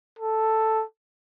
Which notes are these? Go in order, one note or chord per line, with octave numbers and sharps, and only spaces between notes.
A4